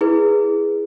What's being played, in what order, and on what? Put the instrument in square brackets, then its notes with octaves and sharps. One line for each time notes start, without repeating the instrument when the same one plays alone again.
[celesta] E4 G#4 B4